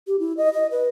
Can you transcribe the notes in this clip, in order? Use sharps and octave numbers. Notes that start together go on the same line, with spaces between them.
G4
E4
D#5
D#5
B4